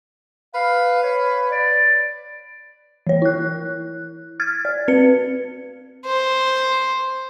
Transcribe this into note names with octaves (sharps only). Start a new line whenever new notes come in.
B4 F5
C#5
D5
E3 C#5
E4 F#6
F6 G#6 A6
D5
C4 B4 C#7
C5